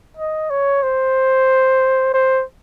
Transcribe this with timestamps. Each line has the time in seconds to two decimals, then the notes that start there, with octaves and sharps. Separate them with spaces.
0.17 D#5
0.50 C#5
0.83 C5
2.14 C5